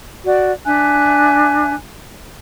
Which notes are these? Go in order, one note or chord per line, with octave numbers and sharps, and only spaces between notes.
F#4 D5
D4 E5 G#5 F#6